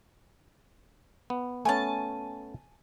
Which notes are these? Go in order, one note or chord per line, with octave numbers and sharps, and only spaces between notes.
B3
A3 B3 C#4 G#5 A5